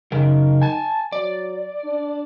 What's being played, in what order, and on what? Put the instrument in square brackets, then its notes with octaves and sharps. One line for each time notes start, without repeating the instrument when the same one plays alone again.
[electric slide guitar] F#2 C#3 A#4 [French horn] D#4
[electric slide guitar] G#5 A5
[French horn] F#3 [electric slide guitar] D5
[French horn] D4